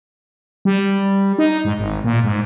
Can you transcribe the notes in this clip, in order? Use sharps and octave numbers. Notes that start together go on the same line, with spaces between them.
G3
D#4
G#2
G#1
A#2
G#2